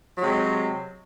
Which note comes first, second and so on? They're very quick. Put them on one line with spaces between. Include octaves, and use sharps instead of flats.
F#3 G#3 C3